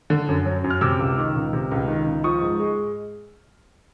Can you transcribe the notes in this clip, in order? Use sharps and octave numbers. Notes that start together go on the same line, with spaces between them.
D3
F#2
F#3
F#2
F6
C3 D6 E6
C#2
D#3
C#2
C3
C#2
D#3
C#2
F3 C#6 D#6
G#2
G#3